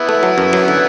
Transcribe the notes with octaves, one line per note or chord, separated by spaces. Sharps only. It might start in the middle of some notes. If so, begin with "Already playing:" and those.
Already playing: B3 E4
A3
F#3
F#2
F#3
D3